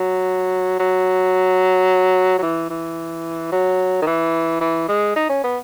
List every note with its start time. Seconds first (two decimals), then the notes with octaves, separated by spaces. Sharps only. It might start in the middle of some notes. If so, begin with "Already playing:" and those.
Already playing: F#3
0.80 F#3
2.39 F#3
2.42 E3
2.70 E3
3.52 F#3
4.02 D#3
4.07 E3
4.61 E3
4.89 G#3
5.16 D#4
5.29 C#4
5.44 B3